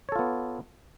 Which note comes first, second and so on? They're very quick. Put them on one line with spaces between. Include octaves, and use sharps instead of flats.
C#5 A4 F4 B3